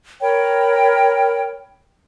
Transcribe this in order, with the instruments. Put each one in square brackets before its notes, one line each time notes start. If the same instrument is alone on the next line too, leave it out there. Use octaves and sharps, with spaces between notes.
[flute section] A#4 C#5 G5 B5